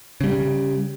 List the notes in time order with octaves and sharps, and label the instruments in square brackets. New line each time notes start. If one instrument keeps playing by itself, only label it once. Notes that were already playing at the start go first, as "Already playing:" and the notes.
[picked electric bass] C#3 G3